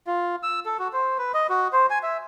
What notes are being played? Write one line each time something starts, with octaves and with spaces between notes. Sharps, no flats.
F4
E6
A4
F#4
C5
B4
D#5
F#4
C5
G#5
E5